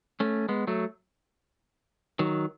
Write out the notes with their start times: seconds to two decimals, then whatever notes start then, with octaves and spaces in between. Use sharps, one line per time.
0.20 A3 C#4
0.49 G#3 B3
0.67 F#3 A3
2.19 D#3 F#3